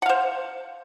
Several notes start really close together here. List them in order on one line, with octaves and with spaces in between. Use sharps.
F#5 F5 C5